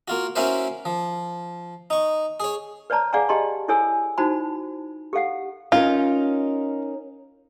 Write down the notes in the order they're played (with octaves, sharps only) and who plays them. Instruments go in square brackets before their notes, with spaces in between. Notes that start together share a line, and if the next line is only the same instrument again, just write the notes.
[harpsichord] A#3 F4 F#4
A#3 C#4 E4 F#4 B4 C5
F3
D#4 C#6
G#4 C#5
[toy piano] B4 C#5 D5 A5 A#5
G#4 D5 F5 F#5 G#5 A#5
G4 D#5 A5 A#5 C6
E4 A4 C#5 G#5 E6
D#4 E4 F#4 C5 A5 B5
G4 A4 F5 F#5
[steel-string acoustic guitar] C#4 D#4 A#4 [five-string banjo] F4